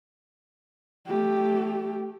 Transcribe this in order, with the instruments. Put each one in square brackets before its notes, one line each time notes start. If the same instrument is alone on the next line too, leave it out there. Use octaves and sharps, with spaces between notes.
[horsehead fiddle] A3 G4